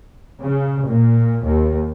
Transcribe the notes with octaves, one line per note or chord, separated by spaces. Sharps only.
C#3
A#2
D#2